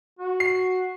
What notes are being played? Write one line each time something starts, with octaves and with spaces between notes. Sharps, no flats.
F#4
C7